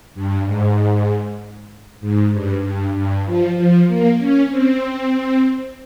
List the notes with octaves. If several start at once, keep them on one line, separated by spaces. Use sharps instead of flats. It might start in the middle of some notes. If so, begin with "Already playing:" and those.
G2
G#2
G#2
G2
G2
G2
F3
F3
A#3
C#4
C4